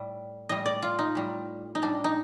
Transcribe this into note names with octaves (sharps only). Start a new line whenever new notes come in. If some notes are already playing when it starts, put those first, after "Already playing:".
Already playing: A2 G3
A2 G3 D#5
D5
F4
D#4
A2 G3
D#4
A2 G3 D4
D#4